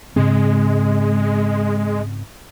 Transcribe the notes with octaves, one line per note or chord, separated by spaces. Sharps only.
G#2 C#3 G#3 C4